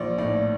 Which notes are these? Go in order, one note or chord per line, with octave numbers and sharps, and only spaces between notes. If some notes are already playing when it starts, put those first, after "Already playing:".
Already playing: A#1 D5
A2 D5